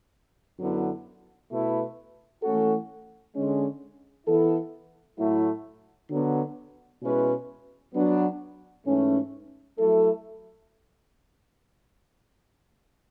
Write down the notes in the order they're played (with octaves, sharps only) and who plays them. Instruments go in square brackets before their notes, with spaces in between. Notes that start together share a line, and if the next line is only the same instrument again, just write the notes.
[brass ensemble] F#2 D3 F#3 B3 E4
B2 A3 E4 B4
E3 A3 C#4 F#4 A4
D3 G#3 C#4
E3 B3 E4 A4
A2 F#3 A3 E4
D3 F#3 B3
B2 G#3 C#4 E4 B4
F#3 B3 D4
G#2 E3 A3 C#4
F#3 A3 E4 A4